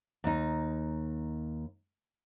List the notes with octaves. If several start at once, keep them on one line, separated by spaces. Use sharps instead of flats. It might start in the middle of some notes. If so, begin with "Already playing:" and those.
D#2 D#4